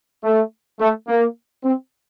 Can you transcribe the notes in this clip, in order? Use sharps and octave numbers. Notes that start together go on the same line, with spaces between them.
A3
A3
A#3
C4